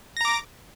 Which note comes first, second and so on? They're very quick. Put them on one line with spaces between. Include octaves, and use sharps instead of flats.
A#6 A#5 D6